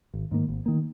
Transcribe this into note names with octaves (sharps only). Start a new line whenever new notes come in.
G#1
G#2 D#3 A#3
G#1
D#3 A#3